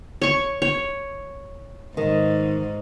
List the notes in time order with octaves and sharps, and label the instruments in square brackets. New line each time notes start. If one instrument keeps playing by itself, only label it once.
[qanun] C#5 C#6
C#5
[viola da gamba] G#2 [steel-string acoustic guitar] D#3